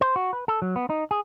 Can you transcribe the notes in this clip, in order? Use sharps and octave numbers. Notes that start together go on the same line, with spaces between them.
C5
F#4
B4
A4
F#3
B3
D#4
G#4